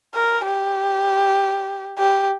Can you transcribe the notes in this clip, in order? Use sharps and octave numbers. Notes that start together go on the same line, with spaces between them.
A#4
G4
G4